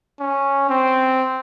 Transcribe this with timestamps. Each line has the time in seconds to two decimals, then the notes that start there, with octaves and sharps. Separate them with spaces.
0.20 C#4
0.70 C4